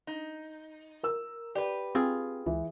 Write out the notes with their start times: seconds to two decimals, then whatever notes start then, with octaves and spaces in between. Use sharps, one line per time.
0.07 D#4
1.03 A#4 E6
1.55 G4 B4 D5
1.95 C4 F4 G#4
2.46 C#2 E3